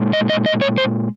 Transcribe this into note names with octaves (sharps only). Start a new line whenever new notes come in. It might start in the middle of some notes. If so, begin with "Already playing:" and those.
Already playing: A#2 G#3
D#5
D#5
D#5
C#5
C5